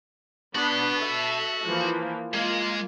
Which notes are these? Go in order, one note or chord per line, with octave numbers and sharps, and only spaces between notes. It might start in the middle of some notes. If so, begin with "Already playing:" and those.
B3 D4 F#4 B5
A4 E5
E3 F3 A#3
G#3 A#3 F4